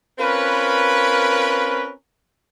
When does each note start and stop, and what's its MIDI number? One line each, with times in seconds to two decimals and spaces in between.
0.19 1.91 60
0.19 1.91 61
0.19 1.91 65
0.19 1.91 70
0.19 1.91 71